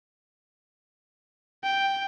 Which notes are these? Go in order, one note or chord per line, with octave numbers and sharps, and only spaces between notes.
G5